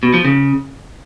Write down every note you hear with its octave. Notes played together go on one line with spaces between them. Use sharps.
B2
F3
C#3